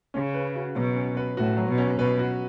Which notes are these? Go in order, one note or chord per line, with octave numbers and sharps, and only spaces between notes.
C#3 C#4
B4
F#4
B2 F#3
C#4
B4
A2 F#4
F#3
B2
C#4
B2 B4
F#4